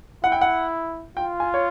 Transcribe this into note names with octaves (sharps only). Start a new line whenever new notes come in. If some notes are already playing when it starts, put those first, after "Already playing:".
E4 F#5
G5
F#5
F4 G5
G#5
C#5